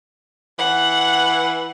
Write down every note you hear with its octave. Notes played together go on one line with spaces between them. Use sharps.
E3 F#5